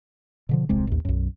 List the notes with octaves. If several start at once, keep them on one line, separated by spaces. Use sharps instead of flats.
B2 D3 F3
D#1 C2 C3 G#3
A1 D#2
B1 F#2